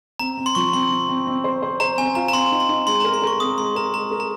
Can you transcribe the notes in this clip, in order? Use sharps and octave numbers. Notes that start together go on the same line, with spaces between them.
C4 A#5
C4
C6
F3 C#6
C4 C6
C4
C4
C4
C5
C5
C5 A#5
C4 G#5
F4 A#5
A#5
C4 C6
D#4
C6
D#4
G#3 C6
A#4 A#5
C6
A#4 C#6
C4 D#6
G#3 C6
A#4 A#5
G#3 A#5
A#4
A#5